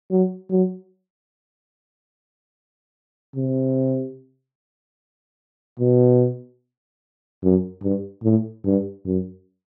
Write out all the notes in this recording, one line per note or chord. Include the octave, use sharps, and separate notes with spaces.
F#3
F#3
C3
B2
F#2
G2
A2
G2
F#2